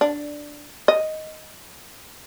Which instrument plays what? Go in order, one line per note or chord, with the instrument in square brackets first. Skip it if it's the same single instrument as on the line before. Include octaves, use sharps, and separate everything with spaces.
[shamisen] D4
D#5